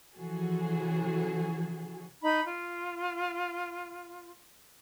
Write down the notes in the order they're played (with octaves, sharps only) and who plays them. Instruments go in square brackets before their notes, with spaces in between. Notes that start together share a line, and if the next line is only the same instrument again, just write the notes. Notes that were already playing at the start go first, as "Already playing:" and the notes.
[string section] C#3 E3 F3 F#4 G#4 A4
[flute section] D#4 B5
F4